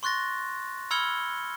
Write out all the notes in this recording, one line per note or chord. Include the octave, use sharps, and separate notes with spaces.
C6 C#6 F#6 A6 A#6
B5 E6 F6 G#6 C#7 G7